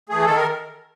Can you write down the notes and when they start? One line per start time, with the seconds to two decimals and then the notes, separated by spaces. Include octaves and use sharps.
0.09 E3 A3 G#4
0.25 D#3 A4
0.36 A#4